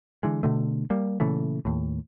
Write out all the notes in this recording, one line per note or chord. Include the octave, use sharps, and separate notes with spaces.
D3 E3 G#3
B2 D3 A3
G3 A#3
A#2 C#3 E3 A3
D#2 A2